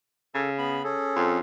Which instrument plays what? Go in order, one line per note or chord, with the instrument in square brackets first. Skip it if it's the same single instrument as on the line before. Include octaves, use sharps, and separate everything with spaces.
[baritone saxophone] C#3 [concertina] A4
[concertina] B3 B5
C#4 G#4 A4
[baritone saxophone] F2